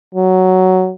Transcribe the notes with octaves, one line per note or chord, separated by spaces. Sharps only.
F#3